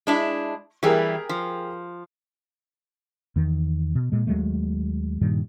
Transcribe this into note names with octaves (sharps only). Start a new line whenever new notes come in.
G#3 D4 E4
E3 G3 G4 G#4 A#4
F3
E2 D#3
B2
A#2 G#3
D#2 F#3 G#3 A3
G2 A#2 D#3 G3